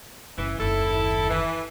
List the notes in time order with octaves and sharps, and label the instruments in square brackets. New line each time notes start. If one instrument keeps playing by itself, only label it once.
[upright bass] F#1 C#3 [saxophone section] E3
[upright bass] F#1 D#2 [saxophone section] E4 A4
[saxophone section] E3